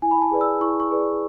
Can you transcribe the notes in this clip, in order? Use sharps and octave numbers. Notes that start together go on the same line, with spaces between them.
E4 G#5
B5
A5
G#4 B4 D5
E6
E4 C#6
C#6
G#4 B4 D5